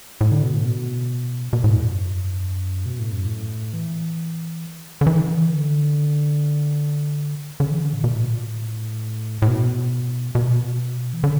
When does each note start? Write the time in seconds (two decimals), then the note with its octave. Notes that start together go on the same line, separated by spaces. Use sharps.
0.21 A2
0.32 D3
0.43 B2
0.54 A2
0.66 B2
1.53 B2
1.64 A2
1.75 E2
1.86 F#2
2.86 B2
2.99 A2
3.12 F#2
3.27 A2
3.73 E3
5.01 D3
5.07 E3
5.50 D3
7.60 D3
7.71 E3
7.82 D3
7.93 A2
8.04 B2
8.15 A2
9.42 A2
9.48 B2
10.35 B2
11.13 E3
11.24 D3